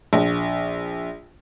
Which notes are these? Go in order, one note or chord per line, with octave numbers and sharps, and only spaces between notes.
A#1